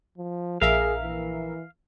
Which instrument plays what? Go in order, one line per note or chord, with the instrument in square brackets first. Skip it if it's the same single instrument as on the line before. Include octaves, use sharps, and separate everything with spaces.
[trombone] F3
[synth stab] A#1 A#4 E5 [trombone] G#4 [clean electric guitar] F5
[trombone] E3